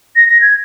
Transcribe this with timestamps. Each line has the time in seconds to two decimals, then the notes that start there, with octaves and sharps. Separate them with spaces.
0.16 A#6
0.29 A#6
0.41 G#6